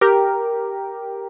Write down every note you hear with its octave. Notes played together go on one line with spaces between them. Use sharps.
G4 A#4